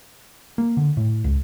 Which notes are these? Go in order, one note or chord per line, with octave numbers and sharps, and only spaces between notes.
A#3
D3
A2
C#2